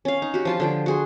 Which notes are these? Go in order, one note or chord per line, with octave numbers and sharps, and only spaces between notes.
C#4 F5
D#4
F#4 G4
F3 F4 A5
D3 F3 G5
F#4 G#4 C6